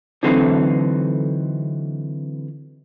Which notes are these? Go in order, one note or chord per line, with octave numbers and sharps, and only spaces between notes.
D3 E3 F#3 A3 C4 D#4